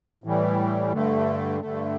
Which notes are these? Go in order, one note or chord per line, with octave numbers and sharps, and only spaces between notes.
A2 E3 G3
G2 D3 A3
G2 D3 A3